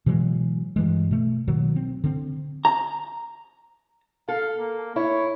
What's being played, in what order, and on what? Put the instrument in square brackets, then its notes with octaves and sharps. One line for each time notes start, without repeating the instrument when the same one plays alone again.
[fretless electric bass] B2 E3 F#3 G#3
G2 E3 G#3
B2 A3
B2 D#3 F#3
C4
D3 C4
[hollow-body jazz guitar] A#5
[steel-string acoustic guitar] A4 [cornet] F5
[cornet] A#3
[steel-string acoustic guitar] E4 [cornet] C#5